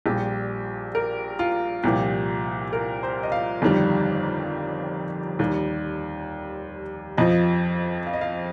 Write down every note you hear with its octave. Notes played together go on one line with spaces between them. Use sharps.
A#1 A#2 G3 G4
A#4
F4
C2 A#2 F3 G4
A#4
C5
D#5
F5
G1 F2 D#3 G3
D#2 D#3 G3
F2 F3 D#5
F5
D#5
F5